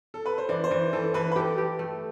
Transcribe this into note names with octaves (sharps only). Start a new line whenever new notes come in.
A4
B4
C5
E3 D5
C5
E3
E3 A4
E3 B4
B4
G4 A4
G4
A3